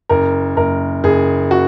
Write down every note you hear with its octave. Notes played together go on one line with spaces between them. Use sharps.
F#1 A#4
F#1 A#4
F#1 G#4
F#4